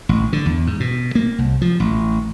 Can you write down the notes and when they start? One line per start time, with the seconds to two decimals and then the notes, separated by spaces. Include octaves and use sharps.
0.09 A1
0.33 D3
0.46 E2
0.67 G#2
0.80 B2
1.15 A#3
1.38 C2
1.61 F3
1.80 A1